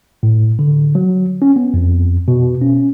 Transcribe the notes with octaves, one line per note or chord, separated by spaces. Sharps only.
A2
D3
F#3
C#4
B3
F2
B2
C#4